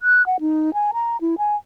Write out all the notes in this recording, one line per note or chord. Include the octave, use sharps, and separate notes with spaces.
F#6
F#5
D#4
G#5
A#5
E4
G#5